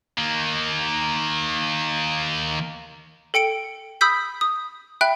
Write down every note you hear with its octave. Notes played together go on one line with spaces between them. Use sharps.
D#3 A#3
A4 G5 C#7 D7
B5 D#6 E6 G6 B6
D#6
E5 G5 B5 F#6